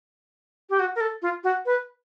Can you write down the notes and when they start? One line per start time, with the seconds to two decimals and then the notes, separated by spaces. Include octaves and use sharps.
0.70 G4
0.79 F#4
0.96 A#4
1.01 A4
1.22 F4
1.44 F#4
1.66 B4